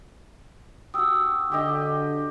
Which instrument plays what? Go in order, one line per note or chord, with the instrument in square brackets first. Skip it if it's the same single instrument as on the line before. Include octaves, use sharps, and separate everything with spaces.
[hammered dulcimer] F#4 G4 [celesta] D#6 E6
[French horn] D3 [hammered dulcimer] G4 D#5